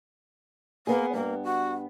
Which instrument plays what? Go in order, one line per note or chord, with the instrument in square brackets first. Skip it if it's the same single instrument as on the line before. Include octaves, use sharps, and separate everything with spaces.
[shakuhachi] A#3 [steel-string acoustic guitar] B3 G#4
[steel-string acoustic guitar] G2 B3 [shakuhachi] A#3
[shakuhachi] F#4